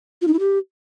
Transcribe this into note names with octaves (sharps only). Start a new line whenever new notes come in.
F4
D#4
E4
G4